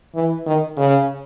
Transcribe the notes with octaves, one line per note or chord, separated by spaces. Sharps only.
E3
D#3
C#3